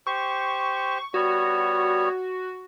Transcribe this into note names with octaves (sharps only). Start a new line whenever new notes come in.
G4 C5 C#6
G3 B3 F#4 C#5